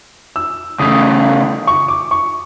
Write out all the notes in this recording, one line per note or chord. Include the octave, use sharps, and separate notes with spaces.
E6
C#3 E3 A3 C#4 D#6
C#6
D6
C#6